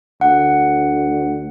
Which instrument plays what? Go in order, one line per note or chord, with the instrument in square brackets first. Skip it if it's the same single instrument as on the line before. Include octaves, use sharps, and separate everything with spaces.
[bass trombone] D2 [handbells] F#5